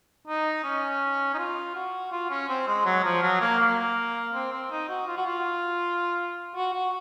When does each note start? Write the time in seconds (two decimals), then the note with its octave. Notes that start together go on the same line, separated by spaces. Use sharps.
0.28 D#4
0.64 C#4
1.34 D#4
1.38 F4
1.75 F#4
2.12 F4
2.30 C#4
2.49 C4
2.68 G#3
2.86 F#3
3.04 F3
3.23 F#3
3.41 A#3
3.60 A#3
4.34 C4
4.53 C4
4.71 D#4
4.89 F#4
5.08 F4
5.17 F#4
5.26 F4
6.56 F#4
6.74 F#4